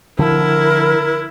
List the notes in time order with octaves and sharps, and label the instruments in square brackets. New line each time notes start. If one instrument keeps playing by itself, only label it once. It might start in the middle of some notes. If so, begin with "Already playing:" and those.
[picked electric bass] D3 F3 [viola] E4 [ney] A#4